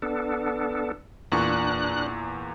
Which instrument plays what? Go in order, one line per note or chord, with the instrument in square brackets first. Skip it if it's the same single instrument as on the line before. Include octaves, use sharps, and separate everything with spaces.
[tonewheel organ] B3 D4 A4
[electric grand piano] E2 A#2 C#6 [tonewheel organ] D4 F#6